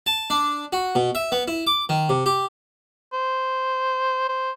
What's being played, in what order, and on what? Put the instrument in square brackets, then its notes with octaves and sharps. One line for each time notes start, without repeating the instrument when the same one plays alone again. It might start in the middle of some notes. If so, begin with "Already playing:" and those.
[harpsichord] A5
D4
F#4
B2
E5
B3
E4
D6
D#3
C3
G4
[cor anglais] C5
C5